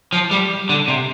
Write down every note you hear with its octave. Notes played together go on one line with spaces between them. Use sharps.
F3
G3
D3
C3